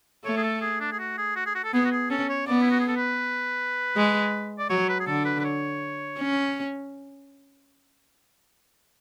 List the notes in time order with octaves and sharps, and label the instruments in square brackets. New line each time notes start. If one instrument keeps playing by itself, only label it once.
[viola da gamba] A3 [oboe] C#5
[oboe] G#4
A4
G#4
D4
G#4
F#4
G#4
F#4
G#4
F#4
A4
[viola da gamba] B3 [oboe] G#4
[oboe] F#4
G#4
[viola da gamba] C#4 [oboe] A4
[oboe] C#5
[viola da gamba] B3 [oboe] D5
[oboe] E4
F#4
G#4
A4
B4
[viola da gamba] G#3
[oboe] D5
[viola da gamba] F#3 [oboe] C#5
[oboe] B4
G#4
[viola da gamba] D3 [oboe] A4
[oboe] B4
B4
C#5
[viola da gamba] C#4